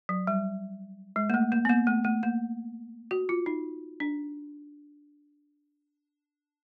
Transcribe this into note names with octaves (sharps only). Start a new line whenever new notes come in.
F#3
G3
G#3
A#3
A3
A#3
B3
A#3
A3
A3
A#3
F#4
F4
D#4
D4